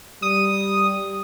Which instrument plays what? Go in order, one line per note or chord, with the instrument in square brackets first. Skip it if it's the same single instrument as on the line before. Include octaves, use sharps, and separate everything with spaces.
[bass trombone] G3 [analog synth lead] D#6